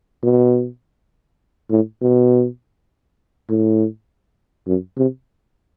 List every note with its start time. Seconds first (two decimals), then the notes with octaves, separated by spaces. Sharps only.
0.23 B2
1.70 A2
2.01 B2
3.49 A2
4.67 F#2
4.97 C3